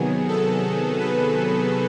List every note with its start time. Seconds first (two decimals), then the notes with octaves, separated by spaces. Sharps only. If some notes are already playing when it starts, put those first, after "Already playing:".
Already playing: C3 D#3 F#3 B3 G#4
0.28 A4
0.99 B4